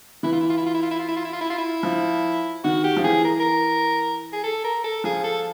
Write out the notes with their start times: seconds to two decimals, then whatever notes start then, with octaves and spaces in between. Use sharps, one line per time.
0.23 E3 E4
0.32 F4
0.41 E4
0.49 F4
0.57 E4
0.66 F4
0.74 E4
0.82 F4
0.91 E4
0.99 F4
1.08 E4
1.16 F4
1.24 E4
1.33 F4
1.41 E4
1.50 F4
1.58 E4
1.83 F3
2.64 D#3 F#4
2.84 G4
2.97 F3
3.04 E3 G#4
3.24 A#4
3.40 A#4
4.33 G#4
4.43 A4
4.64 A#4
4.84 A4
5.04 F3 G#4
5.24 A4